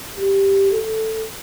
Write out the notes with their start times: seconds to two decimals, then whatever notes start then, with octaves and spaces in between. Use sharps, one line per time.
0.16 G4
0.72 A4